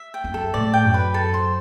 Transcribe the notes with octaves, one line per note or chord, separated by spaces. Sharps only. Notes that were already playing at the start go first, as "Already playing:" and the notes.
Already playing: E5
G5
F#2
A4
A2 D5
G5
F#2
B4
A4
C5